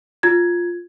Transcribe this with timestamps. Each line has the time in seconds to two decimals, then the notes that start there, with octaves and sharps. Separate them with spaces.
0.23 F4 G#6